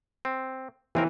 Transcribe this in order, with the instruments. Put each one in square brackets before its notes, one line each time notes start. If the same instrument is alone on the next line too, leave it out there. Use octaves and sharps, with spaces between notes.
[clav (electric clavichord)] C4
[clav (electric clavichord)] D#2 C4 A#4 [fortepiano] E3